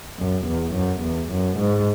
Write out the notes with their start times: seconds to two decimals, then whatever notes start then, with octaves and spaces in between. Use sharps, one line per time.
0.19 F#2
0.46 E2
0.74 F#2
1.02 E2
1.31 F#2
1.59 G#2